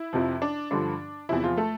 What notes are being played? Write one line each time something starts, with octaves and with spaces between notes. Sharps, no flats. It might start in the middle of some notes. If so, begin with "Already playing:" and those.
Already playing: E4
F2 C3 F3
D4
G2 D3 F3 D4
E2 C3 F3 E4
F3 F4
A3 A4